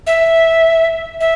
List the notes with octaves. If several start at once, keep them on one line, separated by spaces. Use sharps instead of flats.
E5
E5